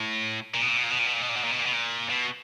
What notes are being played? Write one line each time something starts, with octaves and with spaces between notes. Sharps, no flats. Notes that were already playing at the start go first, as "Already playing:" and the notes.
Already playing: A2
A#2
B2
A#2
B2
A#2
B2
A#2
B2
A#2
B2
A#2
B2
A#2
B2
A#2
B2
A#2
B2